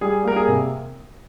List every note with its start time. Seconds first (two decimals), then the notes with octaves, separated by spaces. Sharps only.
0.01 G3 G#4
0.24 A#3 A#4
0.36 G#4
0.48 C3